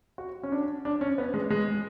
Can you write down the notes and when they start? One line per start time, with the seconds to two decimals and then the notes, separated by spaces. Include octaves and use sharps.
0.18 F#4
0.43 C#4
0.52 D4
0.85 D4
1.01 C#4
1.18 B3
1.34 G#3
1.50 G#3